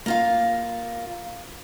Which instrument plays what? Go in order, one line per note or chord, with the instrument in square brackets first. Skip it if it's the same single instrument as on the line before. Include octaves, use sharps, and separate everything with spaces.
[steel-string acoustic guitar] A#3 F4 F5